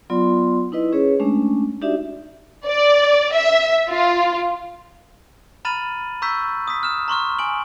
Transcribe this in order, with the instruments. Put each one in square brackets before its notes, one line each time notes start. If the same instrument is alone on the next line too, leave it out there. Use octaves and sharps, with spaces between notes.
[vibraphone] F#3 B3 F4 D5 C6
D#4 E4 B4 D#5
C#4 G#4 B4 C#5
G#3 A3 C#4 D4
D4 D#4 F#4 G4 D5 E5
[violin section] D5
E5
F4
[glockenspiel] A#5 B5 F6 A6 D#7 F#7
A#5 C#6 E6 G6 B6
D#6 B6
F6 E7
A#5 C6 C#6 F6
G#5 D7 F#7